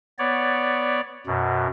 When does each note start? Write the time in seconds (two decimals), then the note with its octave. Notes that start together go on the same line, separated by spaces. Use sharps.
0.19 B3 C#5 D5
1.27 F#2 B2